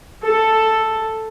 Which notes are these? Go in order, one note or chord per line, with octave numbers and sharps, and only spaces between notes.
A4